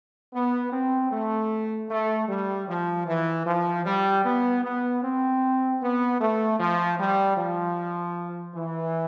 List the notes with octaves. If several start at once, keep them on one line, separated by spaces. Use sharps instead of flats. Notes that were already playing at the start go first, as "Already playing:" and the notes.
B3
C4
A3
A3
G3
F3
E3
F3
G3
B3
B3
C4
B3
A3
F3
G3
F3
E3